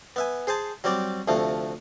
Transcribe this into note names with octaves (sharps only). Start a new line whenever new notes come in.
B3 E5 G#5
G#4 C5 G#5 A5
F#3 G3 C4 D5
D2 C3 F3 A3